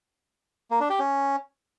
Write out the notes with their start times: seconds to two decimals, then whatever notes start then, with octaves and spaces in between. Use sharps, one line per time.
0.71 A#3
0.80 D4
0.90 G4
0.99 C#4